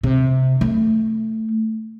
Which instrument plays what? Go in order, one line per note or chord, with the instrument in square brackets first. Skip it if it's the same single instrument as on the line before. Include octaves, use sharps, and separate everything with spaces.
[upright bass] C3
A3